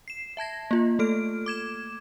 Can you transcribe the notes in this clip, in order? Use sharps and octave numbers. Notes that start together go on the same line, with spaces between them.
C7 E7
E5 A5 G#6 A#6
A#3 F4
A3 A4 F6 D7
D6 G#6 E7